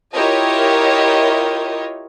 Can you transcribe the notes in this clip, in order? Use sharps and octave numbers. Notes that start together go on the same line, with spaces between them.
E4 F4 G4 A#4 C#5 D#5